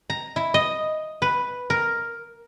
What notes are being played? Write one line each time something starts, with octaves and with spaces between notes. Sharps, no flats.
A#5
E4
D#5
B4
A#4